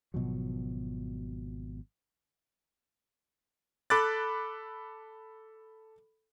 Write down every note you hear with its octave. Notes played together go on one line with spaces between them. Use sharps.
G#1 B2 F3 F#3
A4 B5 D6 F#6 A6